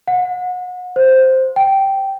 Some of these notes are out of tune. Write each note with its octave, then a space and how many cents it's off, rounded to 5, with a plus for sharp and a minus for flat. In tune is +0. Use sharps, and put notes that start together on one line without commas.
F#5 -35
C5 +0
G5 -10